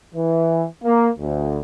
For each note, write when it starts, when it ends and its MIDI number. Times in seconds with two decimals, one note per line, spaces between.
0.14 0.65 52
0.83 1.08 58
1.19 1.60 38